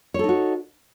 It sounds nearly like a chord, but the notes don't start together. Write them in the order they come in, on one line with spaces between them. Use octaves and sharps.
C#5 A4 D#4 F#4